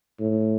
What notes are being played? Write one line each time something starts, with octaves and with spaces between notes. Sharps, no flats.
A2